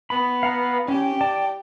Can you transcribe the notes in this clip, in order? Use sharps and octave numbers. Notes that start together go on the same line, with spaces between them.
B3 B5
F5 F#5 A#5
C#4 G4 G5
D5 A5